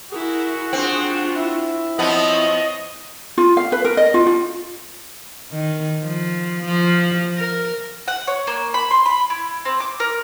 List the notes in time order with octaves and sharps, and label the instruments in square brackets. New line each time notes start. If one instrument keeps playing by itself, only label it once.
[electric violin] E4 A#4 [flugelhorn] F#4 [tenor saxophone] G#4
[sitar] C4 [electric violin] D4 F4
[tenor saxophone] E4
[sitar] F3 B3 [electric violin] C4 C#5 [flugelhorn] D#5
[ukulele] F4
F5
B4
A#4
D#5
F4
F4
[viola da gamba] D#3
F3
F3
A#4
[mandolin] F#5
C#5
A#3
B5
C6
B5
E4
C4
D6
A#4